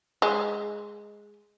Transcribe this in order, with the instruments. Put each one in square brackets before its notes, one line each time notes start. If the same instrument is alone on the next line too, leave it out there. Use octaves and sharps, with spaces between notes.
[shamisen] G#3